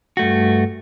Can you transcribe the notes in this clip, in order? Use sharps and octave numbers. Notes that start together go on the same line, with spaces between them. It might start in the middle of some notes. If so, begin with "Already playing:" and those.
G2 A3 F#4